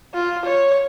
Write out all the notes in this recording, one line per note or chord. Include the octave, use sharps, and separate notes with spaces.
F4
C#5